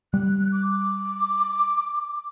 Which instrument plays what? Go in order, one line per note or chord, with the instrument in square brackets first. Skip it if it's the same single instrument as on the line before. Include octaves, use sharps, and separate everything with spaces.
[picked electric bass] G3 [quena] F#6
[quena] D6